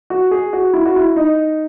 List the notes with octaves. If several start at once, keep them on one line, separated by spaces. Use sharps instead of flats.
F#4
G#4
F#4
E4
F#4
E4
D#4